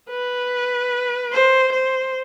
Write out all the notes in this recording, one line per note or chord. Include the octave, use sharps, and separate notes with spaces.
B4
C5
C5